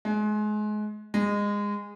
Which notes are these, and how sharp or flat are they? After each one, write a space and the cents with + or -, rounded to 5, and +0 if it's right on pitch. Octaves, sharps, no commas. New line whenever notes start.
G#3 +30
G#3 -20